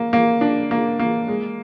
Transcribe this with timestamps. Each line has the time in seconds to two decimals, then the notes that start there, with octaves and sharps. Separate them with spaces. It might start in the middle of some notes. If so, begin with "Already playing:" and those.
Already playing: A#3
0.13 A#3
0.41 D4
0.71 A#3
0.99 A#3
1.28 G#3